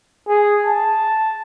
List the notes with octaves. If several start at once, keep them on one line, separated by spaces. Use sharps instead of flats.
G#4
A5